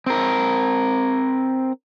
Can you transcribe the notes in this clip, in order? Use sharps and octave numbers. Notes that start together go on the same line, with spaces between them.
C4 A#4